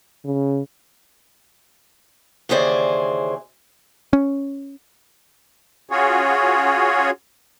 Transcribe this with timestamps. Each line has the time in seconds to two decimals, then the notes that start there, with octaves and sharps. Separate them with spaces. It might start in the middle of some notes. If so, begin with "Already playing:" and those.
0.25 C#3
2.49 D#2 C#3 E3 G#4 C5 D5
4.13 C#4
5.90 C#4 F4 F#4 G#4 C#5